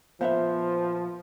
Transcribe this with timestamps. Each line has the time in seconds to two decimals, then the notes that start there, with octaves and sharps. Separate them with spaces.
0.21 A#2 F3 B3 C5 E5 F5